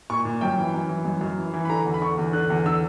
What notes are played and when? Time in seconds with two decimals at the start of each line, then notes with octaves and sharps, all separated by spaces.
0.10 A#2 C#6
0.25 A#2
0.41 F#2 G5
0.58 E3
0.74 F#2
0.89 E3
1.05 F#2
1.21 F#2
1.38 E3
1.53 E3
1.65 B5
1.69 D3 A#5
1.86 E2
1.94 B5
2.02 D3 C#6
2.18 E2
2.33 D3 F#6
2.50 E2
2.66 D3 E6